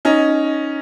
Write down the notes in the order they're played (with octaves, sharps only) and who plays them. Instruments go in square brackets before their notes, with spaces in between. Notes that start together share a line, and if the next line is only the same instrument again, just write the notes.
[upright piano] C#4 D#4